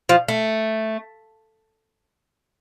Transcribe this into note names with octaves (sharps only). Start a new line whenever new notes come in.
F3
A3